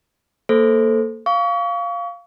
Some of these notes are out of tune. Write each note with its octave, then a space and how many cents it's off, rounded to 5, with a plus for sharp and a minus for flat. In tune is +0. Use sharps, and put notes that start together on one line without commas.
A#3 -15 A4 +0 C5 +0
F5 +0 C#6 +35